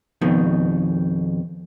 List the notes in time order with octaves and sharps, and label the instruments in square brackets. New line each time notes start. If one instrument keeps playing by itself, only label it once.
[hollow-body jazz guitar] F2 B2 D#3